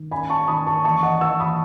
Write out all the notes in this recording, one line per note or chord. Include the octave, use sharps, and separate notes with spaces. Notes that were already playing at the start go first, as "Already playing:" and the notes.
Already playing: D#3
C#4 G#5 B5
A5 C#6
D#3 B5 D#6
A5 C#6
E3 A5 C#6
D#5 F#5
E3 C#6 E6
B5 D#6